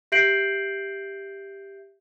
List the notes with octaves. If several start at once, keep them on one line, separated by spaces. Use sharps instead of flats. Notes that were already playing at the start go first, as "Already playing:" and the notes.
G4 E5 G6 C7 D7 F#7